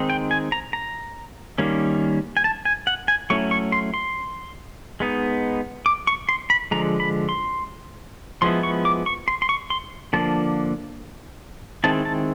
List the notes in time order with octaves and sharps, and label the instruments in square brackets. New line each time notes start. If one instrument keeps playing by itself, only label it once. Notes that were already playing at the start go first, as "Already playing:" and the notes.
Already playing: [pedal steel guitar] D#3 G#3 C4 D#4
G5
G#5
A#5
A#5
D#3 G3 A#3 C#4
G#5
A5
G#5
F#5
G#5
F#3 A3 C#4 E4 C#6
C#6
C6
C6
G#3 B3 D#4
D6
C#6
C6
B5
D3 F3 G#3 A#5
B5
C6
F3 G#3 B3 E4 C6
C#6
D6
C#6
C6
C6
C#6
C6
D3 F3 A#3 D4 A5
D#3 G#3 C4 E4 A5
A5